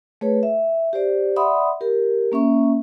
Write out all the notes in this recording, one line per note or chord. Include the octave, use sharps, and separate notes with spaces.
A3 G#4 B4 C#5
E5
G4 C5 D5
D5 E5 F#5 B5 C6 D#6
G4 A#4
A#3 C#4 E5 C#6